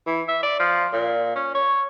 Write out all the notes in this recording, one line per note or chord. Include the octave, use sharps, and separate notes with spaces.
E3
E5
D5
F3
A#2
C#4
C#5